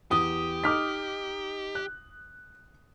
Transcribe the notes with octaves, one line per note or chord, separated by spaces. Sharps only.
E2 G4 D#6
D#4 D6 F6 B6
F#6